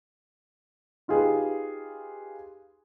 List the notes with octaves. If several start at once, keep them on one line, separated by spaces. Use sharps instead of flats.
D#4 F4 G4 G#4 B4